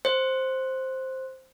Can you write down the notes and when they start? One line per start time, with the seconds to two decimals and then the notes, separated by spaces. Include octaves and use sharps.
0.05 C5